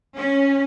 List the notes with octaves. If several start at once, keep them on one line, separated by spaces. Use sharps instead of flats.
C#4